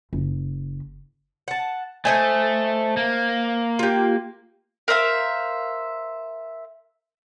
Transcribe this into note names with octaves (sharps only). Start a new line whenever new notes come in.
F#1
F#5 A5
A3 C5 D#5 G#5
A#3
F4 G4
A#4 C5 E5 F5